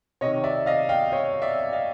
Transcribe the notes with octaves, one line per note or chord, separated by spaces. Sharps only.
C3 C#5 D#5
D#3
D5 E5
D#5 F5
F5 G5
C#5 D#5
D5 E5
D#5 F5